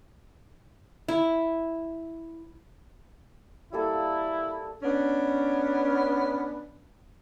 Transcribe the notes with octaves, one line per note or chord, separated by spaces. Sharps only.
E4
G3 A#3 E4 A4
B3 C#4 D4